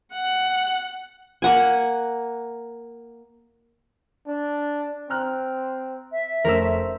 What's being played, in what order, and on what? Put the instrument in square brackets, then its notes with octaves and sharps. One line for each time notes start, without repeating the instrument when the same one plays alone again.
[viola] F#5
[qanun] A#3 F#5 G#5
[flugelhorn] D4
[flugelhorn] C4 [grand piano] A#5 F6 F#6
[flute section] E5
[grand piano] F1 A3 C#4 [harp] A#4 E6 [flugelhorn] C5